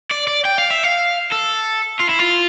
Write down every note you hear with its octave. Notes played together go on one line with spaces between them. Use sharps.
D5
D5
G5
F5
E5
F5
A4
F4
E4
F4